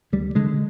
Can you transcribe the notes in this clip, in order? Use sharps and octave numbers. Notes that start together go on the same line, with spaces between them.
D2 G3
D3 G#3